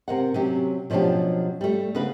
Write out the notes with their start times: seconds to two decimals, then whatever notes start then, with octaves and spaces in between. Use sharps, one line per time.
0.08 C3 A#4 F#5
0.34 C3 F#3 C#4 G4
0.90 B2 F3 F#3 C#4 D4 G4
1.61 G3 A3
1.95 C#3 B3 B4